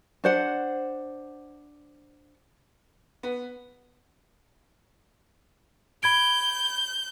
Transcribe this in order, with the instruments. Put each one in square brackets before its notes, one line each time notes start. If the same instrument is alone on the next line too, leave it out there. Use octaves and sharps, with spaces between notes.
[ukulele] D4 C5 F#5
[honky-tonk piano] B3
[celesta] B5 G#6 D7 [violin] G6